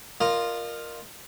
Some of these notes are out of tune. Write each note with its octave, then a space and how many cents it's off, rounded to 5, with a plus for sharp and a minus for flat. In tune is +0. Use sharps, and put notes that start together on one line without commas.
F4 +0 A#4 +0 D#5 -35